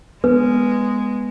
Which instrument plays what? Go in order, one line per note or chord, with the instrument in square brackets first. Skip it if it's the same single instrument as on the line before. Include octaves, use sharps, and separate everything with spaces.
[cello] G#3 [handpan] B3 [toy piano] B4